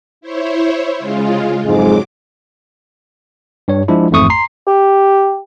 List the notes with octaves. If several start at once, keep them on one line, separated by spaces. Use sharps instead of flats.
E4 C5 C#5
C#3 G#3 F4
F2 G#2 F#3 G#3 D6
G2 C#5
F3 G#3 D4 E4
A1 F2 G#2 A3 C#6 D#6
A#5 C6 C7
G4